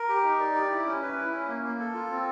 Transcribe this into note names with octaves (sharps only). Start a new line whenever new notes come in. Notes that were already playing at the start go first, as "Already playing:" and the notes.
Already playing: A#4
G4
D#4
D5
G4
E4
C#4
B4
E4
C#4
A#3
A#3
A4
F4
C4